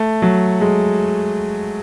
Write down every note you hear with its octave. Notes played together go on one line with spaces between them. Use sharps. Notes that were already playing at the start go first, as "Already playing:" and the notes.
Already playing: A3
F#3
G#3